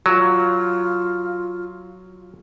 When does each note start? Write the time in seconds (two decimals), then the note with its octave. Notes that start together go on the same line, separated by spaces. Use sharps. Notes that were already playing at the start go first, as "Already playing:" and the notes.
0.06 F#3 F4